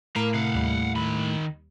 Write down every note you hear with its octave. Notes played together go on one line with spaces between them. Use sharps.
A2 A#4 F5 A#5
C3 F5 F#5
D#2 G3
D#3 B5